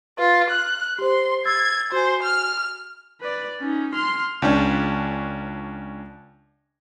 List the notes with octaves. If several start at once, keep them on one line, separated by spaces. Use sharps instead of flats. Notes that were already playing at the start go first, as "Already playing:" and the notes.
F4 B4
F6 F#6
G4 C5 C6
E6 G#6 A6 C7
F#4 C5 G#5
F6
B4 D5
C#4 D#4
C6 F6
C#2 C#4 D4